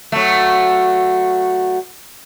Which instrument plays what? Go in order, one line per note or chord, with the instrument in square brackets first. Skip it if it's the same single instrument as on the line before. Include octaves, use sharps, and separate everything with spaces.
[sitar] F#3 A3